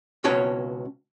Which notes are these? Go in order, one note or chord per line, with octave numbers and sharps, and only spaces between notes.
C#2 B2 C#4 F#4 C#5 A5